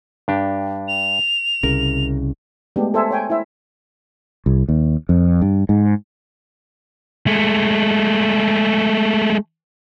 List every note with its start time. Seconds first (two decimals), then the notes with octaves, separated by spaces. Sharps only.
0.28 G2 D4 G4
0.88 F7
1.63 C2 C#3 A#4
2.76 G#3 A3 B3 D4 G4
2.94 A4 C5 E5 G#5
3.11 C#5 G5 G#5
3.30 E4 C5 E5
4.46 C2
4.68 D#2
5.09 F2
5.42 G2
5.69 G#2
7.27 G#3 A3